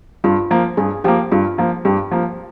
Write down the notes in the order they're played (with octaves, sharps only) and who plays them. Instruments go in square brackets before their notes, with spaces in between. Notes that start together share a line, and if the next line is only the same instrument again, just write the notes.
[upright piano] G2 [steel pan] F4
[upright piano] F3 A#3
[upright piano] G2 [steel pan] G#4
[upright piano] F3 A#3 [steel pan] G4
[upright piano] G2 [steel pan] F4
[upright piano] F3 A#3
[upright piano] G2 [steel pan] G4
[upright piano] F3 A#3